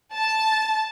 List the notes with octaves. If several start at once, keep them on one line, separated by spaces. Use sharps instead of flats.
A5